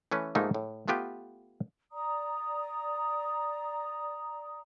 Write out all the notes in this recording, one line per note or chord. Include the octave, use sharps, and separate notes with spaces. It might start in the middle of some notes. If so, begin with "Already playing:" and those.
E3 A3 C#4 B4
G#2 F3 A3 A#3 D#4 E5
A2
A3 B3 F4 G4 B4
D5 A#5 D#6